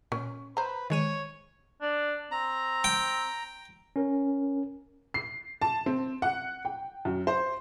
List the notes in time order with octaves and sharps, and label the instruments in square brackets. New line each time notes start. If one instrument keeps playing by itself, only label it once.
[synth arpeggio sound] A#2 [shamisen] C#4
[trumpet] B4 [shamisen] C5 A#5
[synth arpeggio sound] D#3 G#3 D#7 [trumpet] C#5
[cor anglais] D4
[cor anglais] C4 [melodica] A#5
[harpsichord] G5
[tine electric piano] C#4 A#4
[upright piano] C7
A5
C4
F#5
G5
F#2
C5